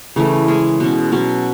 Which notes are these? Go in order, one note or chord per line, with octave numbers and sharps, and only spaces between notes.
C#3 E3 A3 E4
G#3 C#4 G#4
B2 G#3 C#4
B2 F#3 C#4